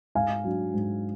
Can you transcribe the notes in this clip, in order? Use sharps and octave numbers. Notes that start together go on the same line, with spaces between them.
G#2 F5 G#5
F#3 D4
G#2